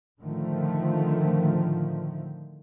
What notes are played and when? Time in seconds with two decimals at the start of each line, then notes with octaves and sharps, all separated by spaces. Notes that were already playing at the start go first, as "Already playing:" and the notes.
0.20 A2 D3 D#3 F3 A3